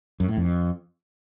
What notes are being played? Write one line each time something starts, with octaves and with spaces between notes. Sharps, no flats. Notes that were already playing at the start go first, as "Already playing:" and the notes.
F#2
A2
F2